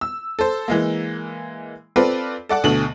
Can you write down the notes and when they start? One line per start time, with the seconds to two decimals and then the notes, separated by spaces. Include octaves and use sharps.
0.01 E6
0.39 A4 C5
0.68 E3 G#3 A#3
1.96 C4 F4 A4 B4 D5
2.49 A4 D5 F#5 D6
2.64 D2 B2 D3 A4 F#7